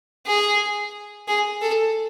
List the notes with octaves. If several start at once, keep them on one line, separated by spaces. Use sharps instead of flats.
G#4
G#4
A4